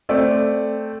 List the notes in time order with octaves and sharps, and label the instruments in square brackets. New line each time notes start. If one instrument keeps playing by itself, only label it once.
[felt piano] A3 C4 D5